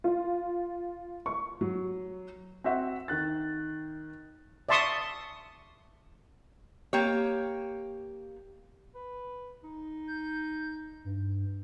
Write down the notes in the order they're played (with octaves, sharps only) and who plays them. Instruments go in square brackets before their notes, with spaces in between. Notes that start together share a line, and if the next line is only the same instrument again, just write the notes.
[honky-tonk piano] F4
C#6
[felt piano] F#3
[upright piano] C4 F#4 E5 F#5
D#3 F#6 A6
[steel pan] D5 E5 A5 C6 C#6 D#6
[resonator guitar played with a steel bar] A#3 G4 C#5
[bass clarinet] B4
D#4
[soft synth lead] G6
G2